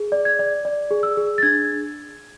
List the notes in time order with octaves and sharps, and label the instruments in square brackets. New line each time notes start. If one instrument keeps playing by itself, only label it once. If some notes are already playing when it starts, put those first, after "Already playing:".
Already playing: [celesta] G#4
D5
G#6
D5
D5
G#4
E6
G#4
A6
D4 G#6